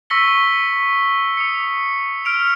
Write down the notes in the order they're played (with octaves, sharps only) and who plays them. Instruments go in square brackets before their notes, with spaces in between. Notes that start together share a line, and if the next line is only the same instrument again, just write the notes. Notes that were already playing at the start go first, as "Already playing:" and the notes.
[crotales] C#6 E6 A#6 B6 C#7 G7
D#6 C#7
F6 D7 F7